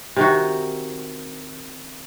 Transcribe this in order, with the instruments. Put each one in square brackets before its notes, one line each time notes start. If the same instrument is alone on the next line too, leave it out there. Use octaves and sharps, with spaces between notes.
[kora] C3 D#3 F#4